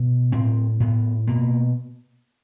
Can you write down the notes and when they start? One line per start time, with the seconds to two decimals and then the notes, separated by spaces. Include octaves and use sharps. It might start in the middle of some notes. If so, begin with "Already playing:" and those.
Already playing: B2
0.32 A2 C4
0.80 A2 B3
1.27 B2 A#3